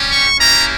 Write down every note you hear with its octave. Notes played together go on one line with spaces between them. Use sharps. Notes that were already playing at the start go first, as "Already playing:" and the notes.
Already playing: G3 C#4 G4
C#6
A#3 C#4 E4 G4 A#5